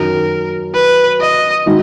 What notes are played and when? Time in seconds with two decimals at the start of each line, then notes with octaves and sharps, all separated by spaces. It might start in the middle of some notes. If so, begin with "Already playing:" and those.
Already playing: F#2 D#3 F#3 A#4
0.74 B4
1.21 D#5
1.66 D#3 G#3 D#4 F#4